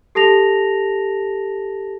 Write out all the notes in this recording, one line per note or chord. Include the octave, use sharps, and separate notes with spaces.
G4 A4 A5 A#6 F7